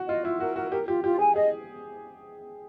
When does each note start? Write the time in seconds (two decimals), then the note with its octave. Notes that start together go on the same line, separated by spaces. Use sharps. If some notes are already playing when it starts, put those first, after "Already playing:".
Already playing: F#4
0.08 F4 D#5
0.24 E4 F4
0.40 F#4 A#4
0.56 F#4 A#4
0.72 G4 A#4
0.88 F4 G4
1.04 F4 G4
1.19 G#4 G#5
1.35 G#4 D#5